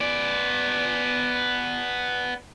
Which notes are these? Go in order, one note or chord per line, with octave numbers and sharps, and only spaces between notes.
B3 D5